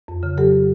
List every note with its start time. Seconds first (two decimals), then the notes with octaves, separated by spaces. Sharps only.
0.08 F2
0.23 C#3
0.37 F#3 G4 A4